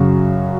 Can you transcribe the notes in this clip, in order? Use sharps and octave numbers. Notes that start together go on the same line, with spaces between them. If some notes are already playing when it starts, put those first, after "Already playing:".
Already playing: F#2 C#3 F#3 F#4